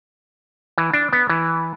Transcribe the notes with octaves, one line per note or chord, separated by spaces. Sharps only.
E3
D4
B3
E3